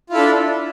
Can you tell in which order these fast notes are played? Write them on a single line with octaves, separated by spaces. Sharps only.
F4 E4 A4 D4